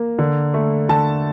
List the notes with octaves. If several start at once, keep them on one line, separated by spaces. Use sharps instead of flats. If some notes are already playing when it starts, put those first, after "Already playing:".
Already playing: A#3
D3
A3
D3 A5